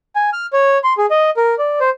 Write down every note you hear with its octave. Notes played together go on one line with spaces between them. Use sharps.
G#5
F6
C#5
C6
G#4
D#5
A#4
D5
C5